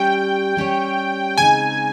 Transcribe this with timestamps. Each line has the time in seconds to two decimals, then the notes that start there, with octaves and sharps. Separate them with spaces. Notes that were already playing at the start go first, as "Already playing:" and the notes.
Already playing: G3 C#4 G4 C#5 G5
0.57 G3 C#4 G4 C#5
1.38 C#3 G#3 C4 D#4 G#5